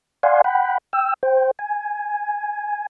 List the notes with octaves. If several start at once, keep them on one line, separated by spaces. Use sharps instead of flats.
D5 F5 F#5 G#5 C6
F#5 G5 B5
G5 E6
C5 G5
G#5